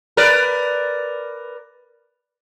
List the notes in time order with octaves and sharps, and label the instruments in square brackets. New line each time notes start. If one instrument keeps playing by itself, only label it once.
[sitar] A#4 B4 D5